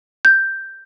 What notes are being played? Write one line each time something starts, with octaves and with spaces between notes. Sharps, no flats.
G6